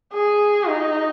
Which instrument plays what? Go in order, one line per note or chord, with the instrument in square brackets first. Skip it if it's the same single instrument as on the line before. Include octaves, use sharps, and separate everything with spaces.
[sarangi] G#4
D#4